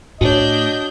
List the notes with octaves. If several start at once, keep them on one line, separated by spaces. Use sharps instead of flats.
A2 D4 F#4 C#5 D#5 G6